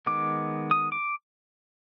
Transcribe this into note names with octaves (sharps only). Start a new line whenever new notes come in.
D#3 G#3 B3 D6
D#6
D6